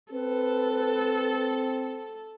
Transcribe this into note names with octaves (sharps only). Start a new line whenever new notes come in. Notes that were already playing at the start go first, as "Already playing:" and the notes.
C4 A4 B4